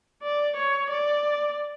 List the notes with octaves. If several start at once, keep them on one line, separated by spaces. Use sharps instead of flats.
D5
C#5
D5